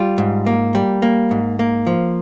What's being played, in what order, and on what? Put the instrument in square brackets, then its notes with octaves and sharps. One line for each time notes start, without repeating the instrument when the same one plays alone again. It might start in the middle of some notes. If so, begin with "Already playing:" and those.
Already playing: [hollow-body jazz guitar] G3 F4
G#2
A#3
G3
A#3
G#2
A#3
F3